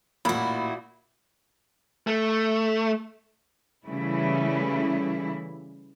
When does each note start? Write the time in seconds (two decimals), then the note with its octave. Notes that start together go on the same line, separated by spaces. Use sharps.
0.25 A1 A#2 E4 F#4 B5
2.07 A3
3.86 C#3 E3 G3 A3 E4